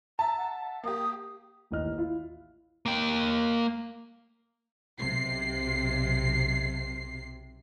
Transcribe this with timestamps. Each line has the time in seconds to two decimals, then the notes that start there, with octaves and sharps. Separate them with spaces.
0.19 E5 A5 A#5
0.37 F#5
0.84 A#3 G4 D#6
1.71 A1 D#2 E3 D#5 F6 F#6
1.98 E4 F4
2.86 A#3 G5
4.98 B1 C3 C7